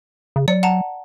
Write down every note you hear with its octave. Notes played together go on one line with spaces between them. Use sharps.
C#3
F#3 D5 C#7
F#5 A5 A#5